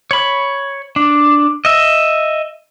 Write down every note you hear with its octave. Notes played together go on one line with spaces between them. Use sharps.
C#5 B5
D4
D#5 E5